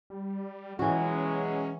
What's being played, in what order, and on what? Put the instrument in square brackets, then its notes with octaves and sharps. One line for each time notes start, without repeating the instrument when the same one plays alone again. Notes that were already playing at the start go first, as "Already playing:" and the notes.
[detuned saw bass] G3
[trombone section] B2 F#3 G#3 [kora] E3 F#4 [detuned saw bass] C#4